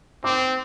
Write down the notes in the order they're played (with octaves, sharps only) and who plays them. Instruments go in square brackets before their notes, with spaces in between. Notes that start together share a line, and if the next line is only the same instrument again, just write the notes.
[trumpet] C4 [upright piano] D6